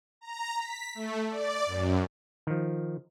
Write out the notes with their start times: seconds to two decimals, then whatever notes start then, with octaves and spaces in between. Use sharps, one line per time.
0.21 A#5
0.58 B6
0.95 A3
1.29 D5
1.66 F#2
2.47 D#3 F3